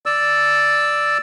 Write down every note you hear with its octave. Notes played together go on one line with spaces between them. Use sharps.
D5 E6